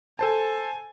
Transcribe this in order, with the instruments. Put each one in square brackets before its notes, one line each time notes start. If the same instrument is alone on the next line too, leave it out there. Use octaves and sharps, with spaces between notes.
[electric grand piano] A4 C5 A5 [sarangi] G#5